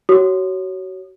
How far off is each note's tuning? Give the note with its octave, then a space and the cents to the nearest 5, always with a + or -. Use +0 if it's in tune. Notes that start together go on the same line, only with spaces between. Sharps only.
F#4 +30 C#5 +0 D#6 -25